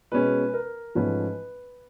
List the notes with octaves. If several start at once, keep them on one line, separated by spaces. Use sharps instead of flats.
B2 G#3 C#4 B4
A#4
G#2 F3 A3 C#4 B4